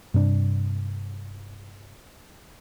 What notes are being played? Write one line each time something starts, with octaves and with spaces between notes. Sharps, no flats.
G2 C3 C4 D4